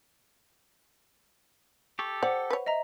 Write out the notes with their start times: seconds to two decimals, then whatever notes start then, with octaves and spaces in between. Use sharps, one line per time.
1.99 G4 A4 C#6
2.23 C5 D5 F#5
2.50 B4 C#5
2.66 D#5 E5 A#5